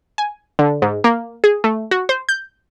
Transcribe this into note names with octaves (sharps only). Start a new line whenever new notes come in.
G#5
D3
G#2
A#3
G#4
A3
F#4
C5
G6